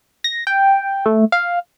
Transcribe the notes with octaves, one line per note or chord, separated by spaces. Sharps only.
A#6
G5
A3
F5